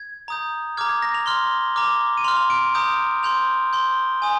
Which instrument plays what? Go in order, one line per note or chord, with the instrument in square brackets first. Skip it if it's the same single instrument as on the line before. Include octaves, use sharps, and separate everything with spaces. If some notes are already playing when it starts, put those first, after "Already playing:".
Already playing: [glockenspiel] G#6
A#5 D#6 G6
A#5 D6 F6 G#6
G#6
A#6
F7
C6 F6 G7
A#5 D6 F6
D#7
C6 F6 F7
F7
D7
A#5 D#6 G6 D7
C6 G6 F7
C6 G6 G7
G#5 D#6